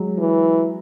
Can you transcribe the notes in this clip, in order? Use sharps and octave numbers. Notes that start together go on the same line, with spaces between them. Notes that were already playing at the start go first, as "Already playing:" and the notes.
Already playing: F#3 G#3
E3